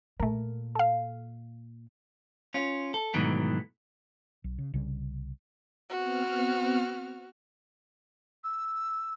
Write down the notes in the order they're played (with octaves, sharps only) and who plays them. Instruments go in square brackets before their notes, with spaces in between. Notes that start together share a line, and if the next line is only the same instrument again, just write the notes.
[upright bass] A#2 [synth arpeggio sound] A3 A#4
[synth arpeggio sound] A4 F5
[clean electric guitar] C#4 F4
A4
G#2 B2 D#3 E3 F#3 A3
[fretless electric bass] B1
C#3
C2 C#3 G3
[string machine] B3 C4 F6 [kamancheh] F#4
[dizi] E6